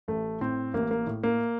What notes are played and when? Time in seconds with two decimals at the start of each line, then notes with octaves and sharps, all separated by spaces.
0.08 A1 A3
0.41 A2 C4
0.74 A1 A#3
0.91 A#3
1.07 A2
1.23 A#3